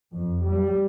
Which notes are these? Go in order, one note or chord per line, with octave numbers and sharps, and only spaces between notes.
F2
G3